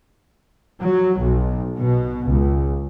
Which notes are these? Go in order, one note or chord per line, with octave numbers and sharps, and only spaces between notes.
F#3
B1
B2
C#2